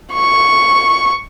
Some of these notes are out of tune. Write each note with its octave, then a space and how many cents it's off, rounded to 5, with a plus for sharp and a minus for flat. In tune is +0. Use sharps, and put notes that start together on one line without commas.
C#6 +0